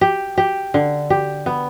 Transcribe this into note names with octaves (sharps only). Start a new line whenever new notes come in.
G4
G4
D3
G4
B3